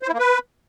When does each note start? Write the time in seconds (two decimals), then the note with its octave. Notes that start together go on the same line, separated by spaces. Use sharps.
0.02 C5
0.08 E4
0.14 A#3
0.19 B4